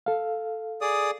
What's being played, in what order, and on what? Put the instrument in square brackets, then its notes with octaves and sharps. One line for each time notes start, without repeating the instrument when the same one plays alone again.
[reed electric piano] A4 F5
[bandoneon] G#4 D5 D#6